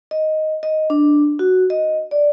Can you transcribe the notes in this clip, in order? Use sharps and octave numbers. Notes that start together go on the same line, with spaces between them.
D#5
D#5
D4
F#4
D#5
D5